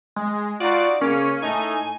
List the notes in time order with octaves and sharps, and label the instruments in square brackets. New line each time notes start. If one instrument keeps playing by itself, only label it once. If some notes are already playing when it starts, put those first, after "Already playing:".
[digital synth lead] G#3
[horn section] D#4 F4 F#4 [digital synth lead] D5
[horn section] C#3 A#3 [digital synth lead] C#4
[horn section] A2 A3 D#4 [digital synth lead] G#5